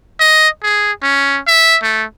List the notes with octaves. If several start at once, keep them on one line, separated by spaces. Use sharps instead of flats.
D#5
G#4
C#4
E5
A3